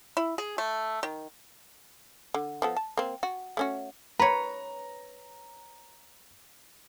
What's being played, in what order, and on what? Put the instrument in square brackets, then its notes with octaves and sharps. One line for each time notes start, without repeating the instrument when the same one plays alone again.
[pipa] E4
G#4
A3
D#3
[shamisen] D3
F3 B3 A4
A5
A#3 C4
F#4
A3 C#4 F#4
[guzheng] B4 C#5 [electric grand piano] A#5